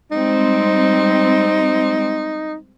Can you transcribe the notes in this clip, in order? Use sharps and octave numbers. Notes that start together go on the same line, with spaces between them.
G3 G#3 C4 D#4